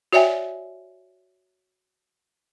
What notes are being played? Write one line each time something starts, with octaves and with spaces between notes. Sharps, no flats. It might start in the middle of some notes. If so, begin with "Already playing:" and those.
F#4 C#5 D5 E5 G5 G#5